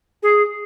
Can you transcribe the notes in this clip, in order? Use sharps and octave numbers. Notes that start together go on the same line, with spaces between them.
G#4